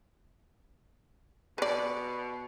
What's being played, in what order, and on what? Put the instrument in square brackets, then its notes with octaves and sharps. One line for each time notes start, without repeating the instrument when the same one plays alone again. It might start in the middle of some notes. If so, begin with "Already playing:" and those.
[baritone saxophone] B2 [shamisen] B4 D5